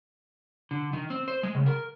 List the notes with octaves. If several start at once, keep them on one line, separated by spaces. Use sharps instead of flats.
D3
D#3
C4
C5
G#3
C#3
A#4